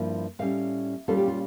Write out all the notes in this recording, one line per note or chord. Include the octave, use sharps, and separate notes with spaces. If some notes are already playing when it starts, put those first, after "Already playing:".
Already playing: G2 F3 A#3 E4
A2 G3 C#4 F5
A#2 G3 C#4 F4 A4
G4
F4